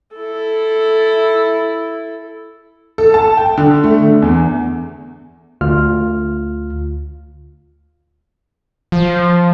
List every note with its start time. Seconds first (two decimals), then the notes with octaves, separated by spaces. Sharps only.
0.16 E4 A4
2.98 A4
3.14 A5
3.37 G5
3.57 D3
3.84 A3
4.02 D3
4.22 E2
5.61 D2 F4 F6
8.92 F3